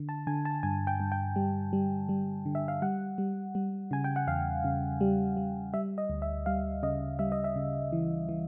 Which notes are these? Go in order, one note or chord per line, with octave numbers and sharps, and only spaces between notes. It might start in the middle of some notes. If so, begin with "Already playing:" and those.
Already playing: D3
A5
D3 G#5
A5
G2 G#5
G5
G2
G5
G3
G3
G3
D3
E5
F5
G3 F#5
G3
G3
C#3 G#5
G5
F#5
E2 F5
C#3
G3
G3
G3 E5
D#5
D2
E5
G3 F5
C#3 D#5
G3 E5
D#5
E5
C#3
E3
E3